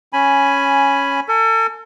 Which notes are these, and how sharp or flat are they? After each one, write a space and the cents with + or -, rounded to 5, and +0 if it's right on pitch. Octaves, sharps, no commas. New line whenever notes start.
C#4 +0 G#5 +5 B5 +0
A4 +40 G#5 +30